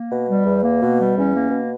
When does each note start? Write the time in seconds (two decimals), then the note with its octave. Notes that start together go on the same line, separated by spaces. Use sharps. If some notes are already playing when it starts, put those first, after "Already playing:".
Already playing: A#3
0.11 B2
0.29 G3
0.45 E2
0.63 A#3
0.82 B2
0.98 G3
1.15 E2 C#4
1.34 A#3
1.51 B2